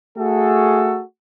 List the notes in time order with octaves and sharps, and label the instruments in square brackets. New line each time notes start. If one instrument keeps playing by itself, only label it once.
[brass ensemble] A3 F#4 G#4 A4